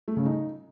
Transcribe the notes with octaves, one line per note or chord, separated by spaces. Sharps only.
A3
C#3
D#4